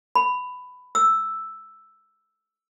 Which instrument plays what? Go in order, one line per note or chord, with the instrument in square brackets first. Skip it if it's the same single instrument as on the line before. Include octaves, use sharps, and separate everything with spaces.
[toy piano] B5
E6